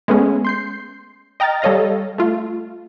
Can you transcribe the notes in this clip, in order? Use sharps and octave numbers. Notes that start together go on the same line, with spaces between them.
G#3 A3 B3 C#4
C6 G6 C7
D#5 G5 A#5 F6 A6
G3 A4 C#5 D#5 F5 A#6
A3 F4